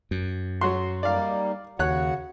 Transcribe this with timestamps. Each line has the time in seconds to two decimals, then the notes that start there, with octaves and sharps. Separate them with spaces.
0.11 F#2
0.61 F#3 F#4 C6
1.03 G3 A#3 D#4 D5 F5
1.79 D#2 C#3 F#4 C#5 F#5 F#6